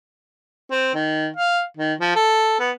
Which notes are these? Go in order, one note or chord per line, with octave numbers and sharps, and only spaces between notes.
C4
D#3
F5
D#3
F3
A4
B3